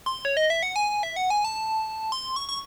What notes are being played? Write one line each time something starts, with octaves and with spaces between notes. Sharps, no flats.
C6
C#5
D#5
E5
F#5
G#5
E5
F#5
G#5
A5
C6
C#6
C#6